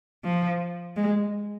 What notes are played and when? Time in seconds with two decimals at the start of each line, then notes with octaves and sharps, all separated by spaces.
0.24 F3
0.96 G#3